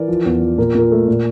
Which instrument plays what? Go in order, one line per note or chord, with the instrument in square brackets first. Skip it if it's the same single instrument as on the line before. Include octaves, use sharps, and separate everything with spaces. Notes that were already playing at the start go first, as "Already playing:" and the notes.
Already playing: [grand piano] E3 A#4 D5
F3
E2
F3
A#2 A#4
A#2 A#4
A3
A#2